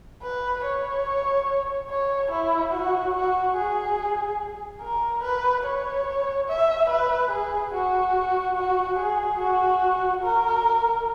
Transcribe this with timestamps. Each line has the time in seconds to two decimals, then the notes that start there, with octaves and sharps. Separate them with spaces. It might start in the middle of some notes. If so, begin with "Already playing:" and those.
0.23 B4
0.65 C#5
1.90 C#5
2.31 E4
2.73 F#4
3.14 F#4
3.56 G#4
4.81 A#4
5.23 B4
5.65 C#5
6.48 E5
6.89 B4
7.31 G#4
7.73 F#4
8.56 F#4
8.98 G#4
9.40 F#4
10.23 A#4